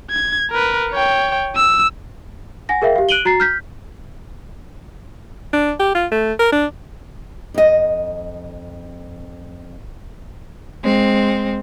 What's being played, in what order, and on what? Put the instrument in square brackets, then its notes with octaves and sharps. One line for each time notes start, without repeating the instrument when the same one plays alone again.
[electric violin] G#6
A#4 B4
C#5 G5
E6
[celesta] F#5 G#5 A#6
G#4 A#4 E5 F5 G5
G4 F5
F#6 D7 D#7 F#7 G7
F#4 A#5 A6 C7
F6 G6 B6
[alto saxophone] D4
G4
F4
A3
A#4
D4
[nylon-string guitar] F2 D#5
[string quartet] G#3 C4